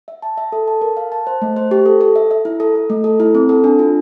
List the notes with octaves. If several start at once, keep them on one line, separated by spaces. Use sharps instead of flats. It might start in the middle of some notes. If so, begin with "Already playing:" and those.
E5
A5
E5
A4
A5
A#4
F5
A5
C5
A3
C5
G4
A4
A4
E5
E5
E4
A4
A4
A3
A4
E4
C4
A4
D4
F4